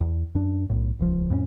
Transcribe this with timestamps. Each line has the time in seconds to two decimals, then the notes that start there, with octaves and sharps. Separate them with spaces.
0.01 E2
0.35 F#2 D4
0.70 B1 A2
0.99 D#1 C#2 F3
1.30 F2 A2 A#3 C#4